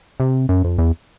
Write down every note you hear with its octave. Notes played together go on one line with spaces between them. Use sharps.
C3
F#2
F2
E2